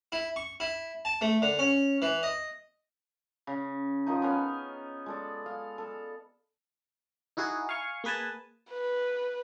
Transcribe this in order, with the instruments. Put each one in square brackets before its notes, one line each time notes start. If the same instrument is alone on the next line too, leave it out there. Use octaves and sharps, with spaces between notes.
[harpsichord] E4
C#6
E4
A5
A3
D3
C#4
E3
D#5
[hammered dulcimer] C#3
D#3 F3 D#4
B3 C#4 F5
G#3 A4 D5
F5
A4
[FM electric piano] D#4 E4 F#4 G#4
F5 G#5 C#6
A#3 G#4 B4 G#5 A5
[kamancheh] B4